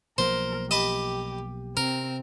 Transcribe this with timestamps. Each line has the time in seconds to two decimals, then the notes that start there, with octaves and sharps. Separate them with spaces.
0.18 B1 F3 A#3 A#4 C5
0.71 G4 D#5 A5 B5
1.77 C3 C4 A#4